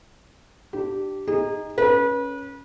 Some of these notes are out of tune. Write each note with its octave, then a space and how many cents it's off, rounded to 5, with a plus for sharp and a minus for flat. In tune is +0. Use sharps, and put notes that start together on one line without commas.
D4 +15 G4 -15
D#4 +0 G#4 -35
C#4 +0 B4 -30